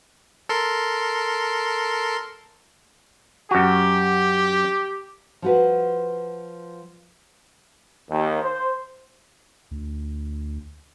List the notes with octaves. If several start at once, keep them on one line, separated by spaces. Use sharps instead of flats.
A4 A#4 C6
F#2 F#4 G4
F3 F#4 B4
D#2
C5
D2